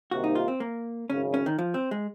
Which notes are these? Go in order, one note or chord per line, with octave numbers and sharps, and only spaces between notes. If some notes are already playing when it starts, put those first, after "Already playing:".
C2 C3 D#3 A#3 F#4
D#4
F4
C4
A#3
G#1 F#2 C#3 C#4
C#4
D#3
F3
C4
G#3